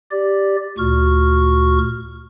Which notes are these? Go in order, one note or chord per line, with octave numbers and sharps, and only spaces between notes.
G4 D5
D2 A#2 F#4 C#6 F6